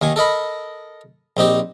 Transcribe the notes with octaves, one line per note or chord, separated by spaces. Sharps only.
D#2 D#3 G#5
A4 A#4 D#5 B5
A#1 C4 D#4 G4